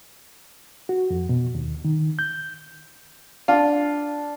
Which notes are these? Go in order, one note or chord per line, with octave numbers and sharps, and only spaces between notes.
F#4
F2
B2
D#2
D#3
G6
D4 F4